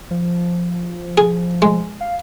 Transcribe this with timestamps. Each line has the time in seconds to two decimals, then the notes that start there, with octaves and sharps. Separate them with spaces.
0.11 F3
1.18 G#4
1.62 G#3
2.01 F5